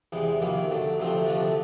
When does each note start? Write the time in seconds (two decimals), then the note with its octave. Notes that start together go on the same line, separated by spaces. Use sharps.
0.12 E2 C3 E3 G#3
0.40 F2 C3 D#3 F#3 A#3
0.70 D3 F#3 A3
0.98 D2 C3 F3 A3 C4
1.26 D2 C3 F3 A3 D4